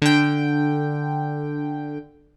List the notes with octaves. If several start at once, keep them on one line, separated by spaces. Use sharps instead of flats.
D3 G5